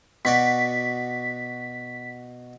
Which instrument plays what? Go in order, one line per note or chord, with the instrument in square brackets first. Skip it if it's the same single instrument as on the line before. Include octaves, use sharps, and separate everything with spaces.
[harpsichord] B2 F#4 D5 [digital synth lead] B6